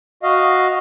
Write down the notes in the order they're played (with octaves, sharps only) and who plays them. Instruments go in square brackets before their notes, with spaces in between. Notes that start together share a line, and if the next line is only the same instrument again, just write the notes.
[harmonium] F#4 D#5 F5